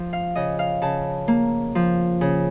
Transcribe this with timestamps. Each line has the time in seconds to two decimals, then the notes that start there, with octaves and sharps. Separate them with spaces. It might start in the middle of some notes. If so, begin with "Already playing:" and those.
Already playing: F3
0.13 F5
0.35 C#3 D#5
0.59 F5
0.82 C#3 A5
1.28 A#3
1.75 F3
2.21 C#3